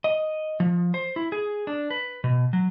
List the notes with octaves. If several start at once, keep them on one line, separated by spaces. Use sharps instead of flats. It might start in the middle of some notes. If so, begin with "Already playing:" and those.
D#5
F3
C5
E4
G#4
D4
B4
B2
F#3